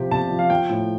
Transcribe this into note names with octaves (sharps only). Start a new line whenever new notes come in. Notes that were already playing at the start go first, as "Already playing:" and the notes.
Already playing: C3 F3 G4
C3 A5
F3
F5
F3 G5
A2